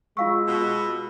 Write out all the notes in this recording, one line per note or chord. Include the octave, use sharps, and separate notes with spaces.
G#3 F4 F5 C#6 E6
B2